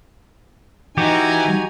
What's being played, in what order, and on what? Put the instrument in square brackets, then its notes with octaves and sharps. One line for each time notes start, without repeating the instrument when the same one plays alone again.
[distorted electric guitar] E3 [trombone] D#4 [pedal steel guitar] F#4 G4 [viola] G#5 A#5